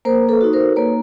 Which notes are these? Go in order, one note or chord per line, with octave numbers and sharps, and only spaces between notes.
A#3 A#4 C5
A4 B4
D#4 F#4
A#4 C5
A#3 B4 C#5